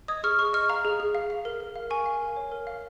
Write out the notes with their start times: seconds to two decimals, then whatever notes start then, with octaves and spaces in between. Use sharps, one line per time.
0.08 D#5 D#6 G#6
0.24 G#4 C#6 F6
0.39 G#4 C#6 F6
0.53 D#5 C#6 F6
0.69 F5 A#5
0.85 G#4
1.00 G#4
1.15 F5
1.30 F5
1.45 A#4
1.60 A#4
1.76 F5
1.90 A#4 G#5 C#6
2.06 F5
2.21 A#4
2.36 C#5
2.52 A#4
2.67 F5